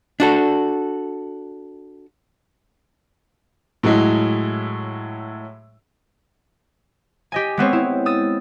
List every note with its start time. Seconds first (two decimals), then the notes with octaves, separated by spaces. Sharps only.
0.20 D4 F#4 A4
3.83 A2 F#3 G#3 E4
7.32 G4 D#5 G#5
7.57 G#3 B3 C4 C#5
7.73 E4
8.06 D#6 E6 A6